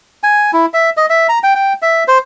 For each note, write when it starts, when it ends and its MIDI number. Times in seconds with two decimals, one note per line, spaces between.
0.23 0.51 80
0.53 0.66 64
0.74 0.90 76
0.97 1.06 75
1.10 1.27 76
1.29 1.39 82
1.44 1.55 79
1.55 1.73 79
1.82 2.04 76
2.08 2.18 72